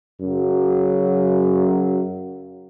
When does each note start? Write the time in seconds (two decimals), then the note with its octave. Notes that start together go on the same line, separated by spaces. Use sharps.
0.21 F#2 C#3 F#3